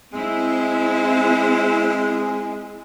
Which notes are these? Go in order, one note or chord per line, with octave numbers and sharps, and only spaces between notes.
G#3 C4 E4